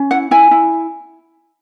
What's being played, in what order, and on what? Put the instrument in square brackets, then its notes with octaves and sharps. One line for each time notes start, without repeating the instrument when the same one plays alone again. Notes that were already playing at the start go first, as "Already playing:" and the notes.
Already playing: [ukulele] C#4
E4 F#5
E4 G#5
E4